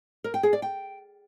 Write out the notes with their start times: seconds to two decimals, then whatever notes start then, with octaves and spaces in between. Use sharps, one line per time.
0.24 A#4
0.34 G5
0.43 G#4
0.53 D5
0.62 G5